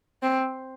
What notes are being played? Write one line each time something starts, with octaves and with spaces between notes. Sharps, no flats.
C4